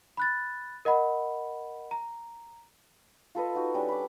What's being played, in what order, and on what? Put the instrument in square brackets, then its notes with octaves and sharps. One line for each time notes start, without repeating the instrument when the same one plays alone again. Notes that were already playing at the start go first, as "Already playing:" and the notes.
[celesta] B5 F#6 A6
A#4 D#5 F#5 B5
A#5
[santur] F4 A4 B4 D#5
D#4 F#4
G3 C#4 D4
B5 D6